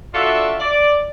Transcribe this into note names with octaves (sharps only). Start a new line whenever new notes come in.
D4 F4 F#4 A4 D5 E5
D5